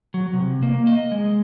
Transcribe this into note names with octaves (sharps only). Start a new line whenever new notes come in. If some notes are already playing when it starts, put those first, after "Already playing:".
F#3
C3
A#3
D#5
G#3